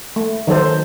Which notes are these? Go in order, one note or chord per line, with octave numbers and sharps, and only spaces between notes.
A3
D#3 F#3 A4 C5